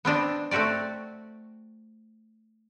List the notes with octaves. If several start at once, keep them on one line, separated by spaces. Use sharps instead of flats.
B3 C4 D4 D#5
A3 C4 F#4 G4 D5